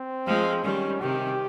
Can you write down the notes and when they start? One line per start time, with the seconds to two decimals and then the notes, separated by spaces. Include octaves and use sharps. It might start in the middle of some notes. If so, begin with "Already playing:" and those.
Already playing: C4
0.26 F3 G#3
0.64 D#3 G3 C#4
1.01 C3 D#3 G4